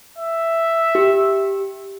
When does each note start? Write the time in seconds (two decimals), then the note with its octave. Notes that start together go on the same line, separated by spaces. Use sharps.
0.18 E5
0.95 G4